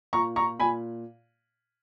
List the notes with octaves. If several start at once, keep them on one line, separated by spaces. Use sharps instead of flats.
A#2 A#5 C#6
A#5 C#6
A#2 G#5 B5